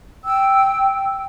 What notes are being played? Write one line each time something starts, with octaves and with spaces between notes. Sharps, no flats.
G5 E6